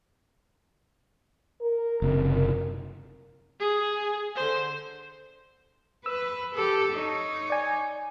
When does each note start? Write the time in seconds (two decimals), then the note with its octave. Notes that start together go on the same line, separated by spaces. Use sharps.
1.62 A#4
2.02 F#1 C3
3.60 G#4
4.36 D3 C5
6.06 B4 E6
6.54 G4 A4
6.93 D#4 C#5
7.50 D5 G#5